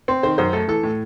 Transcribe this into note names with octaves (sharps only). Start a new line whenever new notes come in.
C4
D#3 C5
F#2 C5
A3 A4
E3 A4
A2